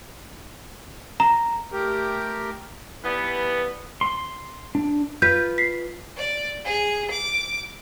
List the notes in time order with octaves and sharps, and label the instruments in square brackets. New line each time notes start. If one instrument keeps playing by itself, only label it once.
[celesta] A#5
[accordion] A3 G4 A#4
[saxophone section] E3 G3 B3
[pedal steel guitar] C6
D4
[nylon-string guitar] F4 B4 [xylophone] G6 B6
[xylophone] B6 C7
[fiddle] D5
G#4
D6